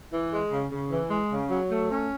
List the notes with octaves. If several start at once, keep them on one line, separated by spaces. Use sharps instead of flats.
E3
G#3
C#3
C#3
E3
G#3
C#3
F#3
A3
C#4